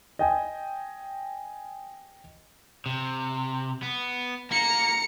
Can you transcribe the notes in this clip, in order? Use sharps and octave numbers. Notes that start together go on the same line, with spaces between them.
D#5 G5 G#5
C3
B3
A#3 A#5 C#7